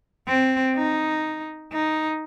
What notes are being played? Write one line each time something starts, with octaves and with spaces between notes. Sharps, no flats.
C4
D#4
D#4